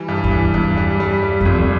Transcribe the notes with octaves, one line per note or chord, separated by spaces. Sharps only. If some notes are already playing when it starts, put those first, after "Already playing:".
Already playing: E3 G3
G2
E2
E3
E2 G2
G3
G3
G3
F#2
G#1 F2